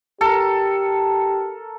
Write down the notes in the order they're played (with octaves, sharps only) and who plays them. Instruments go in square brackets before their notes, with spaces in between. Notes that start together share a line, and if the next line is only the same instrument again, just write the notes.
[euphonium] G4 [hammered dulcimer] A4 A#4